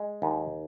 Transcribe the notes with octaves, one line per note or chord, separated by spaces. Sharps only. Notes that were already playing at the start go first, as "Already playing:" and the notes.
Already playing: G#3
D#2